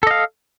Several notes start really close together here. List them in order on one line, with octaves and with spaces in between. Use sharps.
A4 D#5 F5